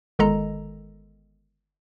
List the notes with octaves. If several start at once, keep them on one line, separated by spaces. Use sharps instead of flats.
G1 D#3 G#3 A4 D#5 A#5